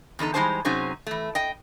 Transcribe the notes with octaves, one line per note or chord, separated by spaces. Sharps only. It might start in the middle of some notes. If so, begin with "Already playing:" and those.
E2 D3 D#4 A4
E3 G3 G#3 D#4 C5 A5
C3 F#3 C#4 D#4 G#4 C5
E3 A3
D#5 G5